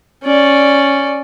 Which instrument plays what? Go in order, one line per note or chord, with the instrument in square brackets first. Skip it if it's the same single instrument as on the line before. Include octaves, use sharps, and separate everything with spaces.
[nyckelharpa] C#4 D5